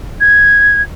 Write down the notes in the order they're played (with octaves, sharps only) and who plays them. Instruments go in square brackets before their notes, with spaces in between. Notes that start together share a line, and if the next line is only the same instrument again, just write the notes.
[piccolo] G#6